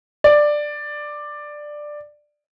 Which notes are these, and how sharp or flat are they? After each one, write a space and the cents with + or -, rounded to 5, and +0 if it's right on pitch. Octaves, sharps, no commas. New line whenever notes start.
D5 +10